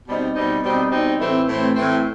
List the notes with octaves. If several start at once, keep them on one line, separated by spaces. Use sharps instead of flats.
B2 G3 C4 D#4
B2 G3 C4 D#4
B2 G3 C4 D#4
B2 G3 C4 D#4
A2 E3 A3 C4
A2 E3 A3 C4
A2 E3 A3 C4